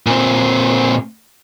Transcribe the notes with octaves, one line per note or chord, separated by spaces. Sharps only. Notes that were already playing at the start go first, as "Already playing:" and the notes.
A#2 C4